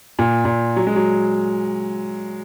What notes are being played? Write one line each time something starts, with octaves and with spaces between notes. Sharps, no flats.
A#2
A#2
F#3
G#3
F#3